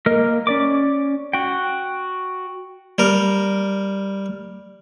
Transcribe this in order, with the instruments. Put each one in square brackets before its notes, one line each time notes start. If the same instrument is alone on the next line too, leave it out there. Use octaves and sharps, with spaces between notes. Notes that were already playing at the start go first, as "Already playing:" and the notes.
[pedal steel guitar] A#3 A#4 D#5 F6
C#4 D5 D6
F#4 G5
[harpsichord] G3 A#4